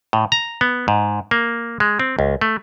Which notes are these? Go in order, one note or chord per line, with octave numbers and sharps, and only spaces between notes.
A2
A#5
B3
G#2
A#3
G#3
C4
C#2
A3